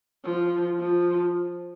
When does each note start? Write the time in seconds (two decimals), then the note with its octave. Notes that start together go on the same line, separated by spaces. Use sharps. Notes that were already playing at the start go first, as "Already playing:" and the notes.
0.24 F3
0.79 F3